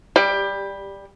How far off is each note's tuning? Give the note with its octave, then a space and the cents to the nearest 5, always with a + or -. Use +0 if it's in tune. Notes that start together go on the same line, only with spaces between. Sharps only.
G3 +0 G4 +20